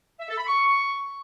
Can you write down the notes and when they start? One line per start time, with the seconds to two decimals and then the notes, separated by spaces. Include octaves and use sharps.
0.20 E5
0.29 A4
0.38 B5
0.47 C#6